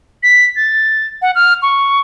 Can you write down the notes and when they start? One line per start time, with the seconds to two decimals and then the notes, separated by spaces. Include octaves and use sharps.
0.23 B6
0.56 A6
1.22 F#5
1.35 F6
1.62 C#6